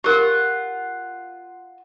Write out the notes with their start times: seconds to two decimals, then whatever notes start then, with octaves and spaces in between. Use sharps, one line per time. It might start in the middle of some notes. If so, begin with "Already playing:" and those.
0.04 F4 G4 A#4 F#5